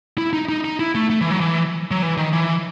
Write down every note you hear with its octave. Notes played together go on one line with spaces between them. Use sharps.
E4
D#4
D#4
D#4
E4
A3
A3
E3
F#3
E3
F#3
E3
D#3
E3